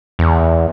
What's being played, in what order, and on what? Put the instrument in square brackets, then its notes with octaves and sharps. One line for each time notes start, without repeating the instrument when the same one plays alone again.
[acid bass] E2